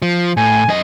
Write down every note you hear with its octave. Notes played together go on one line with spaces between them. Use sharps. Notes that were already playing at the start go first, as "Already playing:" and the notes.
F3
A2 G#5
F#2 D#5